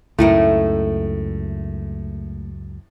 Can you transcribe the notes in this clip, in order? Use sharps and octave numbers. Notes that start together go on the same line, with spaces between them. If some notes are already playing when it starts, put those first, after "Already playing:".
C#2 F#2 A2 A3 D#4 A#4